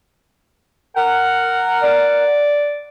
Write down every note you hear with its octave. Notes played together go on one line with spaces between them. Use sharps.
A#4 F#5
D5